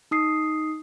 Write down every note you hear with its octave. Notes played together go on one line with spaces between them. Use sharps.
D#4 D#6 C7